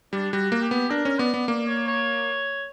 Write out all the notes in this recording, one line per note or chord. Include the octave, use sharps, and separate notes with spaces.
G3 D4
G3 F#4
A#3
G4
B3
D4 A#4
C#4
B3 D5
B3
A#3 D5
C#5
C#5